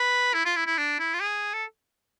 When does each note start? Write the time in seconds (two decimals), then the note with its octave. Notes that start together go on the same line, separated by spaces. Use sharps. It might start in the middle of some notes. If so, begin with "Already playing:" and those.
Already playing: B4
0.34 E4
0.45 F4
0.56 E4
0.66 E4
0.78 D4
0.99 E4
1.14 F4
1.20 G#4
1.54 A4